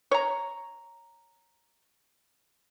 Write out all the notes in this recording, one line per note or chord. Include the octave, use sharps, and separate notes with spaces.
C#5 A#5